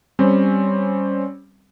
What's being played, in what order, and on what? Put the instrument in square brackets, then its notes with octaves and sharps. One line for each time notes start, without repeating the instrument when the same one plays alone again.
[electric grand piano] G3 C4 C#4